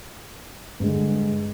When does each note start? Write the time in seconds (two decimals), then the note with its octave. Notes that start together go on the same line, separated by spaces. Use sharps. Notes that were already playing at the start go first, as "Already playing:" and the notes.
0.80 G2 D3 G#3